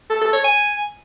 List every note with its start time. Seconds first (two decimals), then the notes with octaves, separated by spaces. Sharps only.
0.10 A4
0.21 A4
0.33 C#5
0.44 G#5